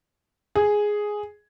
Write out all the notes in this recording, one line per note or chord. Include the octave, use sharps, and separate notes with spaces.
G#4